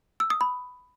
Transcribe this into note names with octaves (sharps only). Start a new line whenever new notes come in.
E6
D#6
B5